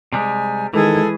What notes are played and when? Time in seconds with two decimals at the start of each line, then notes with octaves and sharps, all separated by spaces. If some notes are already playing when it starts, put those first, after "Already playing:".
0.13 C3 G3 G#3 G#5
0.74 D#3 E3 G#3 G#4 A4